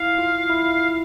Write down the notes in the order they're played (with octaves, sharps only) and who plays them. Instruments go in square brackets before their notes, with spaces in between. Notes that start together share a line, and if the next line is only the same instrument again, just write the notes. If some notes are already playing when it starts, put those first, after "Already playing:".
Already playing: [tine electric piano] E4 [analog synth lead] F5
[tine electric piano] F4
E4